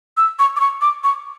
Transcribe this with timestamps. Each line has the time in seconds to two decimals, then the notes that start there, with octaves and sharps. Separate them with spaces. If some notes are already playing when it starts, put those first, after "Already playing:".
0.17 E6
0.39 C#6
0.56 D6
0.60 C#6
0.81 D6
1.04 C#6